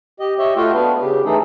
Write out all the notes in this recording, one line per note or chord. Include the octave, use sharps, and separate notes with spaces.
G4 D#5
G4 C#5 D#5 E5
A3 F4 F#4 D#5 F5 G5
B3 D4 B4 F5
C#3 G4
E3 A3 D#4 G#4 A4